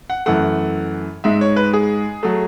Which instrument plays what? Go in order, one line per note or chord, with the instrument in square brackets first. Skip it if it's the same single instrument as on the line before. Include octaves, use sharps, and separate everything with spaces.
[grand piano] F#5
F#2 E3 A3 F#5
G#2 G#3 E5
C#5
B4
G#4
F#3 A3